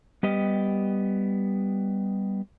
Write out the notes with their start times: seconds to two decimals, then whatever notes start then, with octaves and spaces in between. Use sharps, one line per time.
0.23 G3 B3 G4 D#5